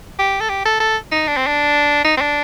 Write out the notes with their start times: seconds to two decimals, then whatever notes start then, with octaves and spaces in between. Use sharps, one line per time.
0.19 G4
0.41 A4
0.50 G4
0.66 A4
0.81 A4
1.12 D#4
1.28 D4
1.37 C4
1.47 D4
2.05 D#4
2.17 C4
2.21 D4